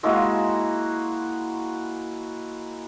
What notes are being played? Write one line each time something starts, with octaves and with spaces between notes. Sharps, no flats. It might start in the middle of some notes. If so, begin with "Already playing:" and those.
G#3 A#3 E4 F#4